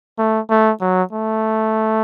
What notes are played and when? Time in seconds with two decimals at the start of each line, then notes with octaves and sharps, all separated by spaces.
0.18 A3
0.50 A3
0.81 F#3
1.12 A3